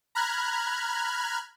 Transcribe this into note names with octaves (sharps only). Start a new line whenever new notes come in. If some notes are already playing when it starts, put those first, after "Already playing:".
A#5 B5 F6 F#6 G#6